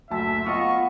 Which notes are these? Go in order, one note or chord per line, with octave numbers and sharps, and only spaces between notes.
F#1 D2 E5 A5
B3 F4 D#5 C#6